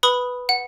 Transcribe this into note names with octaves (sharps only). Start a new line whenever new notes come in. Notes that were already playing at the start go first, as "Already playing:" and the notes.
B4 B5 D#6
F#5